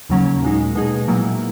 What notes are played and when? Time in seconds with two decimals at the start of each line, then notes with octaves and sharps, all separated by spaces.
0.09 D#2 C#3 F#3 A#3 C#4
0.42 A#2 G#3 D#4
0.75 B2 G#3 D#4 G#4
1.08 A#2 F#3 A#3 E4